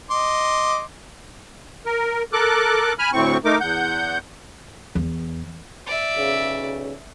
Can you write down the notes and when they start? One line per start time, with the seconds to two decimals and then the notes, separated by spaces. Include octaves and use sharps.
0.11 D#5 C6 D6
1.86 A#4
2.33 A4 A#4 D6 F#6
2.99 G#5 B5 F6
3.13 D2 A2 C4 C#6
3.45 A3 D#4 A#4 D6
3.61 E2 F#5 G6
4.95 E2
5.86 D5 E5
6.16 B1 C#3